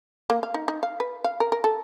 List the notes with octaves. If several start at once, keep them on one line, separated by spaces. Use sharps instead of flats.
A#3
F5
D#4
D#4
F5
B4
F5
A#4
A#4
A4